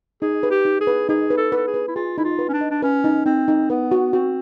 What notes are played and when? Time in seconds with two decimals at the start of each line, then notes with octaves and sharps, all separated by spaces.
0.22 D#4 G#4
0.43 B4
0.51 G4
0.65 D#4
0.80 G#4
0.87 B4
1.09 D#4 G#4
1.30 B4
1.37 A4
1.52 A4 B4
1.67 G#4
1.74 B4
1.88 E4
1.96 F4 G#4
2.18 D#4 E4
2.24 F4
2.39 B4
2.49 C#4
2.53 D4
2.61 D#5
2.71 D4
2.82 C#4 B4
3.04 D#4
3.26 C4 D#4
3.48 D#4
3.70 B3 B4
3.91 F#4
4.13 C4 F#4